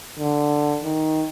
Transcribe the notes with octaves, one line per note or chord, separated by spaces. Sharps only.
D3
D#3